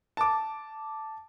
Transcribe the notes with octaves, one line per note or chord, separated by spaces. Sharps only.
A5 D6